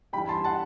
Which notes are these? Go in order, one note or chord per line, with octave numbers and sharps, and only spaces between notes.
G2 E3 G3 G5 B5
A5 C6
F#5 A5